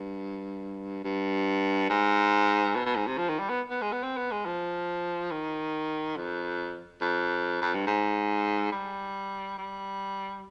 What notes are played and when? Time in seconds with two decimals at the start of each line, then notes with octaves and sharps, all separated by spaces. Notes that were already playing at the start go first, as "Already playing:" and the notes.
Already playing: G2
1.04 G2
1.90 G#2
2.75 B2
2.86 B2
2.96 G#2
3.07 C3
3.18 F3
3.29 D#3
3.39 G3
3.49 B3
3.70 B3
3.82 G#3
3.92 B3
4.03 C4
4.17 B3
4.31 G#3
4.46 F3
5.31 D#3
6.16 F2
7.01 F2
7.62 F2
7.74 G2
7.87 G#2
8.72 G3
9.58 G3